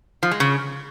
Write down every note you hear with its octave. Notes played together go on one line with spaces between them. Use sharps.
F3
G#3
C#3